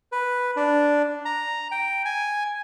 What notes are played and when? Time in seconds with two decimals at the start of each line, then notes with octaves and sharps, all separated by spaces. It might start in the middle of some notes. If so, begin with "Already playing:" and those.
0.12 B4
0.57 D4
1.25 A#5
1.71 G5
2.05 G#5